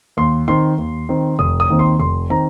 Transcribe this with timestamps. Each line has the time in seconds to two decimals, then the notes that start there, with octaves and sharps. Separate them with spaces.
0.17 D#2 C6
0.48 D#3 C4 C6
0.78 D#2
1.09 D#3 C4
1.39 F1 D#6
1.60 D#6
1.69 D#2 D#3 C4
1.79 C6
2.00 F1 C6
2.30 D#3 C4 A#5